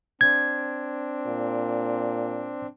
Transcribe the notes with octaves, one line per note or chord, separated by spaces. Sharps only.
C4 D4 G#6
A#2